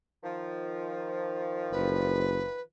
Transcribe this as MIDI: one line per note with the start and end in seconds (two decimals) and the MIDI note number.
0.23 2.63 51
0.23 2.63 53
1.72 2.44 30
1.72 2.60 71